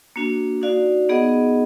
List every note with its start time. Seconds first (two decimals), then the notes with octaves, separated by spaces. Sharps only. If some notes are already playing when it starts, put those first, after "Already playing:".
0.16 A#3 D4 F#4
0.62 D#4 F#4 D5 F5
1.09 B3 D#4 G#4 D#5 F#5